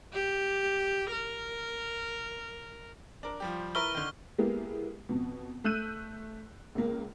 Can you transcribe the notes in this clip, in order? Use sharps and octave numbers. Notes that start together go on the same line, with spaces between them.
G4
A#4
D4 A#4
F3 G3 G4
E4 A#4 B4 C#6 F6 G7
D3 D#3
G#3 A#3 B3 E4 G4
F2 B2
A3 E6 F#6 G6 D#7
C#2 A#3